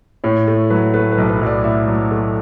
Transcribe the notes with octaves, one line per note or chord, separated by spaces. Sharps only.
A2 C#5
A3
F#3 B4
A3 B4
B4
B1
B4
B1
D5
A2 E5
F#3
A3